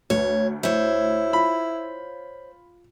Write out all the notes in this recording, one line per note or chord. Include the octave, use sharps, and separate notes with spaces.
D2 C#5
E4 C5 C#5
F4 B5